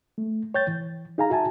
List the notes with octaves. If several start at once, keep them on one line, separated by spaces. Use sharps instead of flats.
A3
C#5 G5 G6 A6
E3
D#4 G#4 F5 G#5 A#5
F#4 E5 G#5 A5